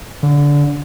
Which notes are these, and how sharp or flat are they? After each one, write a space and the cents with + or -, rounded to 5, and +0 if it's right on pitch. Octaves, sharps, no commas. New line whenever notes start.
D3 -20